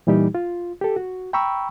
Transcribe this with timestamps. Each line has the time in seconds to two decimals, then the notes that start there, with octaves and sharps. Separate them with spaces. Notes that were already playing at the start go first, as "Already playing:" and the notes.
0.07 A#2 E3 G3 D#4 G4
0.35 F4
0.81 G4 A4
0.96 F#4
1.33 G5 A#5 B5 C#6 E6